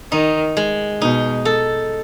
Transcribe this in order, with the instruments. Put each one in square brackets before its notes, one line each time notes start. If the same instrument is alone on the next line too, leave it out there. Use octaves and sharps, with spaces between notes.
[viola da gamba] D#3 [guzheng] D#4
[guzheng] G#3
[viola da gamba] B2 [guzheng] D#4
[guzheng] A4